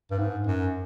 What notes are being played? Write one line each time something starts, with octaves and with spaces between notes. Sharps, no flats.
G2
G#2
F#2